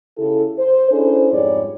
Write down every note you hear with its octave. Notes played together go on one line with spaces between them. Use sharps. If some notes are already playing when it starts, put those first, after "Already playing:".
C#3 E4 G4 A4
C5
C#4 D4 E4 G#4 A4 C5
F2 G#2 G3 G#4 C#5 D5